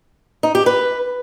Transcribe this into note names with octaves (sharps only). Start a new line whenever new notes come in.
D#4
G4
B4